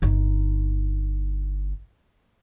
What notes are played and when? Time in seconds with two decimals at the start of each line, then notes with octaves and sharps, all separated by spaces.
0.02 G1 D#4